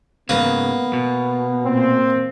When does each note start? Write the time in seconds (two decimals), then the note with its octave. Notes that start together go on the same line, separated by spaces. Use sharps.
0.29 G#2 C#3 A#3 B3 B4
0.93 B2
1.65 A#2 C4